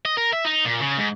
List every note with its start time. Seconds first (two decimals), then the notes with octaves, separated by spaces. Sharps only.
0.05 D#5
0.17 A#4
0.33 E5
0.44 D#4
0.65 A#2
0.80 C#3
0.98 G#2